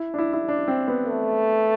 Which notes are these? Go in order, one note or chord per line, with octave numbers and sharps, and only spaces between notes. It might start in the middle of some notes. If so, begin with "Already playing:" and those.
Already playing: E4
D4
E4
E4
D4
C4
B3
A3